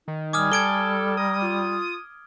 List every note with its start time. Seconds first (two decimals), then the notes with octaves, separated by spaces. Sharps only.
0.08 D#3 D#4
0.33 G3 G#5 D6 D#6 F6
0.52 A4 G#6 D7 G7
1.17 A#5 D#6
1.42 F4